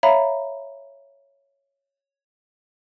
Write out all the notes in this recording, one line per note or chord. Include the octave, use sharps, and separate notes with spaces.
C#5 E5 F5 A#5 B5